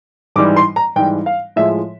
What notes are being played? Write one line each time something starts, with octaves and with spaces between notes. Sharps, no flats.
G#2 E3 G3 D6
C6
A#5
G#2 E3 G3 G5
F5
A2 F3 G#3 E5